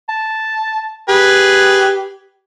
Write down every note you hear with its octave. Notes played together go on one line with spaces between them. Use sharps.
A5
G4 G#4 B4